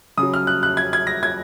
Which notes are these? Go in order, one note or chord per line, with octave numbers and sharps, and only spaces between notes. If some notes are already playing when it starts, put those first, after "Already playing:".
C#3 F#3 D#6
F6
F#6
F#6
G#6
G#6
A#6
G#6